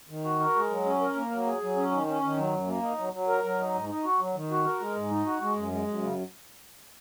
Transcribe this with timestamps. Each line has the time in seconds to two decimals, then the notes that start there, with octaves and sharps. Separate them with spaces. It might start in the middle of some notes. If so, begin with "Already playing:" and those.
0.09 D#3
0.24 F#4
0.40 A#4
0.55 G#3
0.70 F#3
0.85 C#4
1.01 A#4
1.16 A#3
1.31 F#3
1.46 G#4
1.62 F#3
1.77 C#4
1.91 D#3
2.07 C#4
2.23 D#3
2.37 F#3
2.53 F#2
2.67 A#3
2.82 D#4
2.98 F#3
3.13 F#3
3.28 A#4
3.44 F#3
3.59 D#4
3.74 G#2
3.89 D#4
4.04 F#4
4.19 F#3
4.35 D#3
4.51 F#4
4.65 A#4
4.80 G#3
4.96 G#2
5.11 D#4
5.26 F#4
5.42 G#3
5.56 F#2
5.72 G#3
5.87 F#2
6.02 C#3